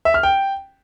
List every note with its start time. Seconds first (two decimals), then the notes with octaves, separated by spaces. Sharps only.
0.05 E5
0.14 F6
0.23 G5